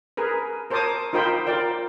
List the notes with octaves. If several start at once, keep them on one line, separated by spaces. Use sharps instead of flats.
G#4 A#4 B4
A#4 C5 C#5 A5 D6 D#6
D#4 F4 A#4 C5 G5 B5
F4 A#4 D5 G5